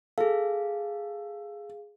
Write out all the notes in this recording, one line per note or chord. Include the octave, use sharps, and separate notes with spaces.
G#4 A4 F5